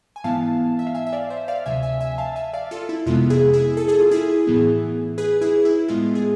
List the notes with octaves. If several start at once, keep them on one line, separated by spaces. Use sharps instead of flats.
G#5
G#2 E3 B3 E4 F5 A5
E5
F5
E5 G#5
E5
D5 F5
C5 E5
D5 F5
D2 C3 F3 E5 G#5
E5 G#5
E5 G#5
F5 A5
E5 G#5
D5 F5
F4 A4
E4
F2 C3 E3 G#3 B3 F4
E4 G#4
E4 G#4
A4
G#4
F4
E4 G#4
A2 E3 B3
G#4 B4
E4 G#4
E4
A2 G#3 B3 E4 F4
G#4